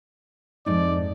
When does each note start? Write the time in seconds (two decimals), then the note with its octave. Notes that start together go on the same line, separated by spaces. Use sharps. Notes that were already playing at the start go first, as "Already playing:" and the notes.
0.66 F2 G#2 D#4 D5